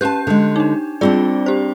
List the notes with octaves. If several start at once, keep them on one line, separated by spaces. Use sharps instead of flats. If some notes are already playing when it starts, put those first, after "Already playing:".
C#4 G4 B4 A5 G6
D3 G#3
D4 D#4
G3 C4 D4 F4 G#4 D5
G4 C5